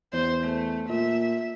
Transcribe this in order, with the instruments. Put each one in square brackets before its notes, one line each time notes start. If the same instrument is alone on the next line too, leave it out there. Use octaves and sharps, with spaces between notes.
[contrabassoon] E2 [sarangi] C5
[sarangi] A3
[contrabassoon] A#2 [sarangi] E5